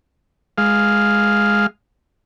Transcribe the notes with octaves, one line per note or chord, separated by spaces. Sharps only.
G#3 F5